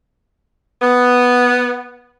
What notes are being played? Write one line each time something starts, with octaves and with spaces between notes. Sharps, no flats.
B3